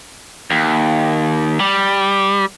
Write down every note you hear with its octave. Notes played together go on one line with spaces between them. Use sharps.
D#2
G3